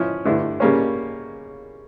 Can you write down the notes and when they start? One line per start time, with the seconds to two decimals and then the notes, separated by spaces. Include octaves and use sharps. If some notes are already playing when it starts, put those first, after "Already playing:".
Already playing: F3 C#4 E4
0.25 G2 D3 A3 E4
0.60 C#3 G3 A#3 C#4